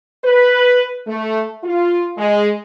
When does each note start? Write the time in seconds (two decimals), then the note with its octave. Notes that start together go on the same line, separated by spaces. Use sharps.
0.25 B4
1.07 A3
1.64 F4
2.18 G#3